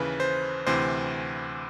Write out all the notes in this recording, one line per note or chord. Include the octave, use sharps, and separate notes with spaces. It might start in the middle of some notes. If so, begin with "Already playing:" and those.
Already playing: D#2 C#3 E3 B4
C5
D2 C3 E3 C5